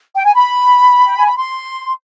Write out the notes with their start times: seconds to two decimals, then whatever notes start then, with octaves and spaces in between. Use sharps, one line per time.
0.15 G5
0.24 G#5
0.33 B5
1.07 G5
1.16 G#5
1.26 B5
1.37 C6